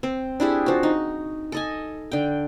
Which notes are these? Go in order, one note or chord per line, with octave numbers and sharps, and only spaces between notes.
C4
D4 E4 G4 G#4
F3 F#4
D#4
A4 D#5 G#5
D3 G5